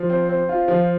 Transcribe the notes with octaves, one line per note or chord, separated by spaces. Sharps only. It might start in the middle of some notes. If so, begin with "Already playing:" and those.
Already playing: F3
C4
C4
F4
F3